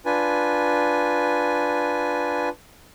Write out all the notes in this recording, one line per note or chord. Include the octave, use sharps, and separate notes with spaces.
D4 F4 B4 G#5